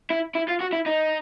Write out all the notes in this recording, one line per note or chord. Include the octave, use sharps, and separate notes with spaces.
E4
E4
F4
F#4
E4
D#4